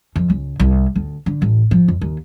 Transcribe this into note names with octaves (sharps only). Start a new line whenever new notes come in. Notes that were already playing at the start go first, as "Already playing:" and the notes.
F2
C#2
C2
D2
D3
A1
F3
F2
D#2